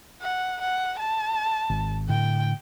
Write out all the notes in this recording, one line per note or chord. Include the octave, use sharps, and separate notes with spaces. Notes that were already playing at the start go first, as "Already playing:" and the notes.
F#5
F#5
A5
G#1
A2 D3 G5